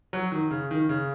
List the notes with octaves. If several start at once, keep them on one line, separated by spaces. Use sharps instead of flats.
F#3
D#3
C#3
D#3
C#3